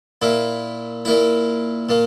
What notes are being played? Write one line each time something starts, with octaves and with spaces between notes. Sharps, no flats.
A#2 A#3 E4
A#2 A#3 E4
A#2 A#3